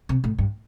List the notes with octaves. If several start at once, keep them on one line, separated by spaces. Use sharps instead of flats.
C3
A2
G2